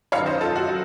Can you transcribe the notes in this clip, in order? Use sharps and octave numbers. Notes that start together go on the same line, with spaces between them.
F#2 D#3 F#3 C#5 F5
C5 D#5
F4 A4
F#4
F#3